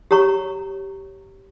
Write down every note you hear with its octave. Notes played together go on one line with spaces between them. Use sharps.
G4 C#5 A#5 C#6